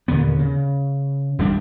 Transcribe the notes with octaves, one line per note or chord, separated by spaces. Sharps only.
D#2 A#2 D3 B3
C#3
D#1 G#1 G3 D4